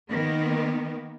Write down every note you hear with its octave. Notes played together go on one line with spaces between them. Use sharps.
D#3 A#3 B3